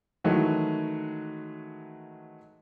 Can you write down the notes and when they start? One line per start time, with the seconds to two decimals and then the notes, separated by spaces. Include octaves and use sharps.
0.24 D#3 E3 F#3 G#3 A3